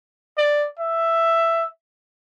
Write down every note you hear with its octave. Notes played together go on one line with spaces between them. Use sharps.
D5
E5